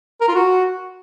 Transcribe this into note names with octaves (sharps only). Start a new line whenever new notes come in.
A#4
F4
F#4